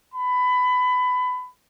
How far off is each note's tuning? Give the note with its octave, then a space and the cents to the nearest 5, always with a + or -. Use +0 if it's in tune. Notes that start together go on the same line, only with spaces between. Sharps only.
B5 +20